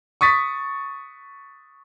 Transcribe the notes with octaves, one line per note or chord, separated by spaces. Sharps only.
C#6 D#6 A6 B6